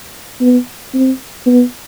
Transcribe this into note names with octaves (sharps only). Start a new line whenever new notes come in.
B3
C4
B3